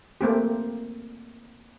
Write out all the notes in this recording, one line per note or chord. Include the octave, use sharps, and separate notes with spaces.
A3 A#3 C4 G4